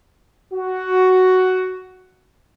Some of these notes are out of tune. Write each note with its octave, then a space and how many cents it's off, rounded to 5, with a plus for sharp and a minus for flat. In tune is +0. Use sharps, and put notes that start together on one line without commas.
F#4 +5